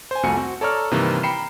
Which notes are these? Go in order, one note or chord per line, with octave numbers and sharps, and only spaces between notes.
C5 G#5
C2 F2 A3 F#4 G#5 C#7
C4 F#4
A4 C#5 D5 A#5 C#6 F6
G2 C3 D#3 E3 A#3
G5 A#5 B5 C7 C#7 E7